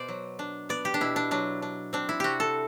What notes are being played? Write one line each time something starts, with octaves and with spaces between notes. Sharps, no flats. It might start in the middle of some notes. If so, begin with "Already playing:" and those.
Already playing: B2 B3 C5 D5
F#3
D4
B3 D5
G4
D4
B2 E4
D4
F#3 D4
D4
C4 D4
E4
C3 F#4 G4
A4